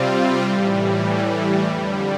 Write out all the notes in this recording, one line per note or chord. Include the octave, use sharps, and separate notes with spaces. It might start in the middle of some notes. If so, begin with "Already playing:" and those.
Already playing: C3 G3 C4 F4
A2 E3 G3
F2 D3 G3